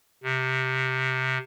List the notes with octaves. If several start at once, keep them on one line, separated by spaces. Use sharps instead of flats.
C3